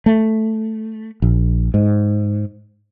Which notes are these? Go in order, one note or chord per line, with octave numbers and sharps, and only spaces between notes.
A3
A#1
G#2